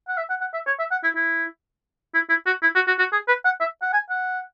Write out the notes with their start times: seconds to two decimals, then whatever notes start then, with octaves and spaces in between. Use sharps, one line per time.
0.08 F#5
0.18 E5
0.30 F#5
0.41 F#5
0.54 E5
0.67 C#5
0.79 E5
0.92 F#5
1.04 E4
1.16 E4
2.14 E4
2.30 E4
2.46 F#4
2.63 E4
2.76 F#4
2.88 F#4
2.99 F#4
3.13 G#4
3.28 B4
3.45 F#5
3.61 E5
3.83 F#5
3.93 G#5
4.10 F#5